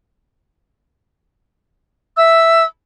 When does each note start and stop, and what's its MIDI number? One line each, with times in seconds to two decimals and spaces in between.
2.16 2.63 76
2.16 2.63 88